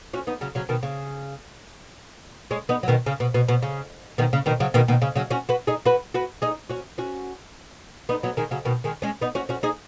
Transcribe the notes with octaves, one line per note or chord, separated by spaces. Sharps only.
C#4 F#4
B3 D#4
C#3 F#3
C#3 F#3
B2 D#3
C#3
G#3 C#4
B3 D#4
F#3
B2 D#3
C#3
B2
B2
B2
C#3
B2 D#3
C#3
B2 D#3
C#3 F#3
B2 D#3
B2 D#3
C#3
C#3 F#3
C#4 F#4
F#4 B4
D#4 G#4
F#4 B4
F#4 B4
D#4 G#4
C#4 F#4
C#4 F#4
B3 D#4
F#3 B3
D#3 G#3
C#3 F#3
B2 D#3
D#3 G#3
G#3 C#4
B3 D#4
C#4 F#4
C#4 F#4
D#4 G#4